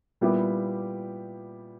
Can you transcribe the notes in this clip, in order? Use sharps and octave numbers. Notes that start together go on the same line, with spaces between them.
A#2 G3 B3 E4 G4